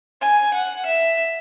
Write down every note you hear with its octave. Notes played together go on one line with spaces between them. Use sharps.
G#5
F#5
E5